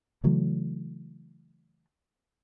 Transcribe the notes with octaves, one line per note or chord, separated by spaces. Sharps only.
C#3 E3 F#3 A3